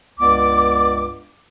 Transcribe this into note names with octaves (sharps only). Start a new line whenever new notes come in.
C#2 G2 B3 D5 D6